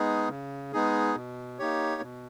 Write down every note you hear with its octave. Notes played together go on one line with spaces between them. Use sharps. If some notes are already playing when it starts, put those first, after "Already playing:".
Already playing: G#3 B3 D#4 G#4
C#3
G#3 B3 D#4 G#4
B2
A#3 D#4 G4 C#5
B2